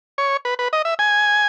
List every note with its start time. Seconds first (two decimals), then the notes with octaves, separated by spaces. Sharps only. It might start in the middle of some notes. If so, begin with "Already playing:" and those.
0.18 C#5
0.45 B4
0.59 B4
0.73 D#5
0.85 E5
0.99 G#5